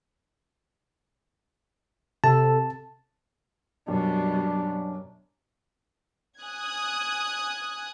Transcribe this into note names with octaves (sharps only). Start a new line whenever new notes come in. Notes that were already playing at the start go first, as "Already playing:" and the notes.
C3 A4 A5
F#2 B2 G3 D4
G#5 D#6 F#6 G#6